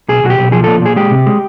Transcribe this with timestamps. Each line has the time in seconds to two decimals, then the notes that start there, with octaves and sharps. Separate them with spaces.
0.09 B1 G#4
0.23 B1 F#4
0.30 G4
0.39 B1
0.52 F3 G#4
0.64 A#2 A4
0.82 A#2 G#4
0.96 G#3 G4
1.11 C3
1.27 G#3